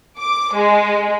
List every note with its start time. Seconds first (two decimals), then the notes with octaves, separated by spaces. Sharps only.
0.18 D6
0.54 G#3